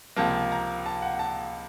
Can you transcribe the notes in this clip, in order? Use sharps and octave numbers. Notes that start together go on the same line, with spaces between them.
C#2 C3 F3 A#3 A5
A#5
A5
F#5
A5